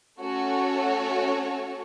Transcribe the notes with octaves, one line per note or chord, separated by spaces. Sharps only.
A3 C#4 F#4 A4 C#5